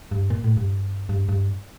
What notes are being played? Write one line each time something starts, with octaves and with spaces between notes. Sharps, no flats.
G2
A#2
A2
G2
G2
G2